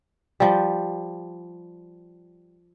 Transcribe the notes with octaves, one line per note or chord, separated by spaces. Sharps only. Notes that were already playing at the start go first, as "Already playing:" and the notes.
F3 G3